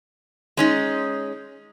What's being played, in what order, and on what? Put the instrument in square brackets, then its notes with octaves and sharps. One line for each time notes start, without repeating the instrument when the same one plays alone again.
[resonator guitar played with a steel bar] G#3 C#4 D#4